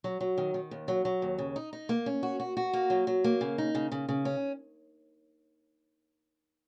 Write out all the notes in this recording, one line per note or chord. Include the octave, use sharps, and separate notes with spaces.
F#3
F#3
D#3
D#3
D#2
F#3
F#3
D#2
C#3
D#4
D#4
A#3
C#4
F#4
F#4
F#4
A#3
F#3
F#3
A#3
C#3
D#4
C#3
C#3
C#3
C#4